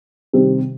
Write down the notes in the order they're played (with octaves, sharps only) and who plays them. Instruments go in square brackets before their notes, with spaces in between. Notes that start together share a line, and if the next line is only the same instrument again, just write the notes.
[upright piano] C3 D#3 G3 C4